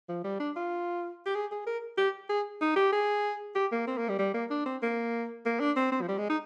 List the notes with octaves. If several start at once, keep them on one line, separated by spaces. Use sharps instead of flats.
F3
G3
D4
F4
G4
G#4
G#4
A#4
G4
G#4
D#4
G4
G#4
G4
A#3
C4
A#3
G3
G3
A#3
D4
C4
A#3
A#3
D4
C4
C4
F3
G3
G#3
D#4